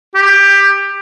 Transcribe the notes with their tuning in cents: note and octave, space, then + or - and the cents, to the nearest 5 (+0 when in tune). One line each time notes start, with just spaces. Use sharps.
G4 +15